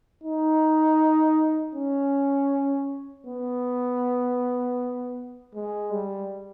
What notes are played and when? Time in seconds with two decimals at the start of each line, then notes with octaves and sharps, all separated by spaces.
0.24 D#4
1.75 C#4
3.27 B3
5.54 G#3
5.91 G3